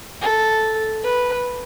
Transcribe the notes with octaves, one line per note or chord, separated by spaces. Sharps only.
A4
B4